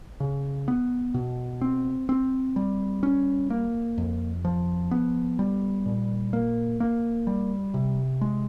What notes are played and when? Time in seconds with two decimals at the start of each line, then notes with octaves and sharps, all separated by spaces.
0.20 C#3
0.68 B3
1.14 B2
1.61 C4
2.09 C4
2.56 G3
3.03 C#4
3.50 A#3
3.98 F2
4.45 F3
4.91 B3
5.39 G3
5.86 A#2
6.33 A#3
6.80 A#3
7.27 G3
7.74 C3
8.21 G#3